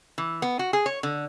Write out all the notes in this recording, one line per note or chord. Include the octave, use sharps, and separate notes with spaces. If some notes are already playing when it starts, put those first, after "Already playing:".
E3
B3
F#4
G#4
C#5
D3